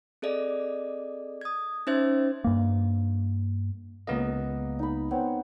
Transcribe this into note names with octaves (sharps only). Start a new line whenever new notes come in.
C4 G#4 A4 D5 D#5
D#6 G#6
C#4 D#4 C5 E5 G#6
G2 A#3
C#2 A#3 B3 D#5
D#4 B5
B3 C4 C#5